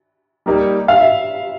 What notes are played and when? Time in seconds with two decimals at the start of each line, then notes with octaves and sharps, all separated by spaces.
0.46 G3 A#3 D#4 G4
0.88 F5
1.00 E5